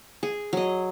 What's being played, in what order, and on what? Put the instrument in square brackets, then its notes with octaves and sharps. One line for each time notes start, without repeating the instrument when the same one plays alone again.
[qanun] G#4
F#3 D#5